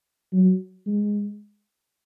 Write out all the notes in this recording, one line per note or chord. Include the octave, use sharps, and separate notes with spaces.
F#3
G#3